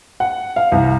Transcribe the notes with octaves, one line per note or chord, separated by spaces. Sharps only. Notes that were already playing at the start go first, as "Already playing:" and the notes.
F#5
F5
C2